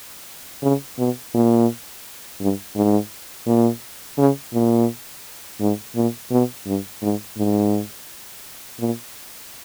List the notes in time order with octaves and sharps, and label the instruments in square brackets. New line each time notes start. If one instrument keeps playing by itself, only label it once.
[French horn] C#3
B2
A#2
G2
G#2
A#2
C#3
A#2
G#2
A#2
B2
G2
G#2
G#2
A#2